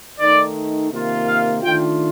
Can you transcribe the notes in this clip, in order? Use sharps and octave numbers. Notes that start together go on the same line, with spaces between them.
D#3 A3 D#4 D5
C3 D#3 A#3 F4
F5
D#3 A3 D4 F4 G5